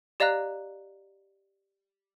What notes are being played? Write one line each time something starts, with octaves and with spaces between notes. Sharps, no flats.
G4 D5 D#5 F5 A#5 F#6